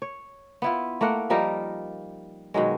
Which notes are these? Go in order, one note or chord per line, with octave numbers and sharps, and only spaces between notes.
C#5
B3 E4 F4
A3 A#3 A#4 F#5
F3 G3 D#4 A#4
B2 D#3 F#3 G#3